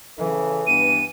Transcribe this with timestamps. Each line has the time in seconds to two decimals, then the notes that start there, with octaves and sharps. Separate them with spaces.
0.18 C#3 E3 A4
0.67 G2 B3 D#7